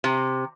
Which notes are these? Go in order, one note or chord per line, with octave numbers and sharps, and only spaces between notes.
C3